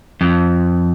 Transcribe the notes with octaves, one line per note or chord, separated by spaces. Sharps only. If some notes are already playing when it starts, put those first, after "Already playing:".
F2